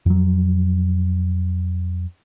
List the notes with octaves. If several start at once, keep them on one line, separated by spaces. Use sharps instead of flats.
F2 F#3